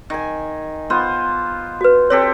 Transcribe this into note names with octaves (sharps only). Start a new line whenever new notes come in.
D#3 G#5
B3 F4 C5
F#4 B4
C4 G4 A4 C#5